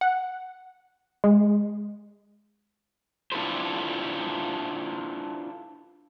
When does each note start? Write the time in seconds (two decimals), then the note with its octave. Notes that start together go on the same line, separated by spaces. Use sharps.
0.01 F#5
1.24 G#3
3.32 D4 E4 F4 A4 B4 C5